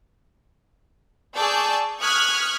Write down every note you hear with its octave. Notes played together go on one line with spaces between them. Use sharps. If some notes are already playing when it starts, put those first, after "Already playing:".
G#4 D5 A5 C#6 E6 G6
C#6 D#6 F6 F#6 G#6 B6